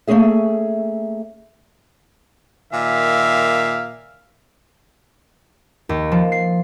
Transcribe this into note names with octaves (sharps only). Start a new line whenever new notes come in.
A3 A#3 C#4 G#4 E5
A#2 D#3 E5 F5
D#2
F3
C7